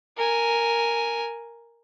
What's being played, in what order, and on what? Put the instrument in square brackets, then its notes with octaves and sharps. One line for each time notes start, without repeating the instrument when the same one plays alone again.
[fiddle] A#4 G#5